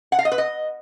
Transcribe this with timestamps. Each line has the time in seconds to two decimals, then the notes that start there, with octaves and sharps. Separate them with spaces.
0.12 F#5
0.19 F5
0.25 D#5
0.32 B4
0.38 D#5